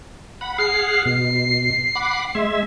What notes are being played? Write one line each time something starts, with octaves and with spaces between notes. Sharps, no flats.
F#5 B5
G#4 F#5 F6 C7
B2 C7
F#5 B5 D6
G#3 E5